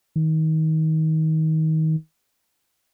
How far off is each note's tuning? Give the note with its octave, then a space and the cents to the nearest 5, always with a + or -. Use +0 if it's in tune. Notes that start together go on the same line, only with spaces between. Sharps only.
D#3 +25